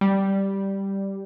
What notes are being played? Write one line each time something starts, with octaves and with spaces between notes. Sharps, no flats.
G3